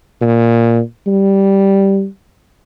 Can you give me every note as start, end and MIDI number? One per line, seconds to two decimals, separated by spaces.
0.21 0.80 46
1.07 2.06 55